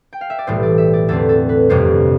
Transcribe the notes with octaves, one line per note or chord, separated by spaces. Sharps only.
G5
F5
E5
D5
B1 A2 E3 G3 C5
D5
E5
D5
E2 D3 A3 C4 A4
A4
B4
G1 F2 C3 G3 C5